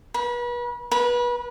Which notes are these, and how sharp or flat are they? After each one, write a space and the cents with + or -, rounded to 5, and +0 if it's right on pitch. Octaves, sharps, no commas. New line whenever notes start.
B4 -35
B4 -30